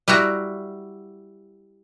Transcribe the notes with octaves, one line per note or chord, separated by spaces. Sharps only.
G3 E4 F#4 A#5